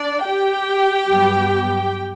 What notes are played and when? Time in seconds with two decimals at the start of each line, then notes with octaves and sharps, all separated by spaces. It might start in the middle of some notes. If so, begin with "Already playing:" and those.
Already playing: D4 D5
0.26 G4 G5
1.09 G2 F#3 B3